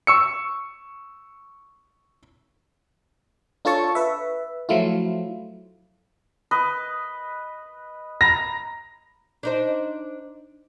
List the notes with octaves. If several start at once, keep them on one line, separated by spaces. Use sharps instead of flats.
C#6 E6 C#7
D4 F4 A4 C#5 A5 C#6
B4 E5
F3 F#3 A3 E4 F4
B4 D#5
A#5 B5 A#6
D4 D#4 C5